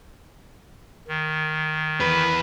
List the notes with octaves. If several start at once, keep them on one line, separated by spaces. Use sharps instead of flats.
D#3
E2 B4